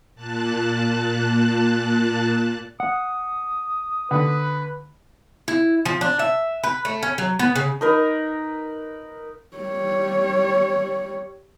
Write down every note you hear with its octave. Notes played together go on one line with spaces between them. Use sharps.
A#2 A5 F#6
F#5 D#6
D3 B4
E4
F3
D4
E5
B4
A3
C#4
F#3
B3
C#3
D#4 A#4 B4
G3 C#5